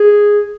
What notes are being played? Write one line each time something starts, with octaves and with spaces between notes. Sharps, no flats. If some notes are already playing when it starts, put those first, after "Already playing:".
Already playing: G#4